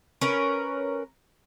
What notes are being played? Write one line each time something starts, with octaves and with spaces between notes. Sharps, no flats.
C#4 A#4 B4